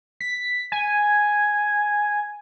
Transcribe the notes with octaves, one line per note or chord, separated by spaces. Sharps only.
B6
G#5